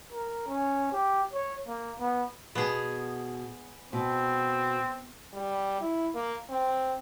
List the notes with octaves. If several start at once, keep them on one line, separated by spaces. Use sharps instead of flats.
A#4
C#4
G4
C#5
A#3
B3
B2 B3 G#4
B2 C4
G3
E4
A#3
C4